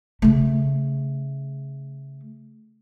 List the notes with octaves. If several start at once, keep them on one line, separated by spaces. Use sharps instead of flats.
C#3 A3